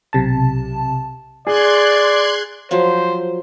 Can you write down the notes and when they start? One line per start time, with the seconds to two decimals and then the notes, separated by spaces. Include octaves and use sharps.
0.13 B1 C3 A5
1.47 G#4 D5 C6 F#6 G#6
2.71 F3 F#3 C5